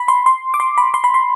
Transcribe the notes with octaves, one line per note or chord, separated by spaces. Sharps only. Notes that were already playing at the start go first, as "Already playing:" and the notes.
Already playing: B5
C6
C6
D6
C6
B5
C6
B5
C6